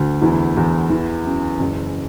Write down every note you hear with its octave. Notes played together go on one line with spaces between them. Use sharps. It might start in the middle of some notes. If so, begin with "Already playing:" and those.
Already playing: D2
E2 E4
E2
E3
F#2
F#1